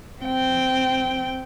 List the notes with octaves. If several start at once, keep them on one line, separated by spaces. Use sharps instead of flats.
C4 G5